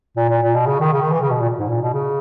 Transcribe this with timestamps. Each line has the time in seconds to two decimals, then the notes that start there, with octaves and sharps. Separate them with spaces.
0.17 A#2
0.29 A#2
0.43 A#2
0.55 B2
0.67 C#3
0.80 D#3
0.93 C#3
1.02 D#3
1.12 E3
1.21 C#3
1.31 B2
1.40 A#2
1.59 G#2
1.69 A#2
1.82 B2
1.94 C#3